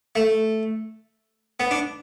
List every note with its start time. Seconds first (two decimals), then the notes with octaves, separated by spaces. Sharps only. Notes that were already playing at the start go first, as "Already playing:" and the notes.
0.16 A3
1.60 B3
1.71 D4